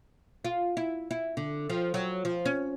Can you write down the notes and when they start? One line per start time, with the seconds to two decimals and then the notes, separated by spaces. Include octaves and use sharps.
0.45 F4
0.77 E4
1.11 E4
1.37 D3
1.70 F3
1.94 F#3
2.25 F3
2.46 C#4